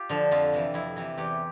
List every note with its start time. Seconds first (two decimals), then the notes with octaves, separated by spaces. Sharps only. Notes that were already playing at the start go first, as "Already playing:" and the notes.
Already playing: F4 G4
0.09 D3 F3
0.31 F2 F4
0.53 C3 E3
0.74 F2 E4
0.96 C3 E3
1.18 E2 G4